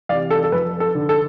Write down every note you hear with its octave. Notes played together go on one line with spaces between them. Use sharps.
C3 E3 D5 F5
A4
A4
F2 B4
A4
D3
A4